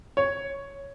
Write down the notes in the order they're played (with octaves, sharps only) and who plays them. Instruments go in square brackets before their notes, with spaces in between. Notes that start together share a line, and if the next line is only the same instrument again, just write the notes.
[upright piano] C#5